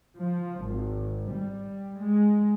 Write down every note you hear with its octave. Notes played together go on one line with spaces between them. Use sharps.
F3
G#1
G3
G#3